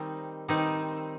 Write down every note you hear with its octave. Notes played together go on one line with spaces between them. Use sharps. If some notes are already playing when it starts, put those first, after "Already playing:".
Already playing: D#3 G3 C4 D#4
D#3 G3 C4 D#4